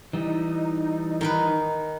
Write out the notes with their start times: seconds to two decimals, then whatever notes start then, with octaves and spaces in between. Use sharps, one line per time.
0.13 E3 G3 D#4
1.21 D#3 A#4 B4